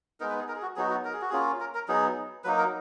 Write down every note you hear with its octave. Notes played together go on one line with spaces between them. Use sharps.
G#3 B3 D#4 A#4
B4
G#4
A#4
G#4
F#4
F#3 B3 D#4 F#4 G#4
F#4
A#4
G#4
F#4
A#3 C#4 F4 G#4
A#4
A#4
F#3 B3 D#4 G#4
F#3 A#3 D#4 B4
A#4